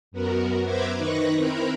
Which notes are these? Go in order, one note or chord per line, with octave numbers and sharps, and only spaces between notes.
F#2 B3 F#4 A#4
B4 C5 E5 A#5 D6 G#6
D#3 D#4 B4 C#6 F#6 A#6
C4 E4 A#4 A#5 B5